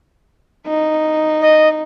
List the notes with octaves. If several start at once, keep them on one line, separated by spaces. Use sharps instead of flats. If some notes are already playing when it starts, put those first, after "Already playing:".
D#4
D#5